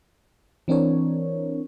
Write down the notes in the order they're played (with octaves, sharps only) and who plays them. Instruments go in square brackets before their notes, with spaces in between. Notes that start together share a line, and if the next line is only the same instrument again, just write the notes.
[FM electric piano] E3 C4 D4 A#4 C#5